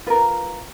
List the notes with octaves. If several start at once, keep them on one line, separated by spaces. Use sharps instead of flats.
F4 A#4 B4